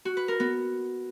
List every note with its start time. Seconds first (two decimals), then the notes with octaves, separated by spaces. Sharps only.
0.05 F#4
0.17 B4
0.28 A#4
0.40 B3